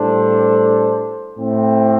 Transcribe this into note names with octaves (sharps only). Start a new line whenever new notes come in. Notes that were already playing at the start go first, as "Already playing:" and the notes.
Already playing: A2 G3 D4 A4 C5
A2 A3 C4